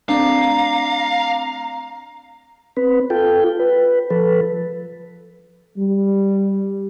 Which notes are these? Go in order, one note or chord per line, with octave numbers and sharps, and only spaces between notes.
A3 C4 D4 F5 A#5
C4 B4
F4 A4 G5
B4
F3 A4 B4
G3